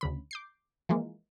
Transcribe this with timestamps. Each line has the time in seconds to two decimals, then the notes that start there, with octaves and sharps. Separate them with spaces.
0.01 D2 C#3 B5
0.31 D6 G6 C7
0.89 E3 F3 G#3 A#3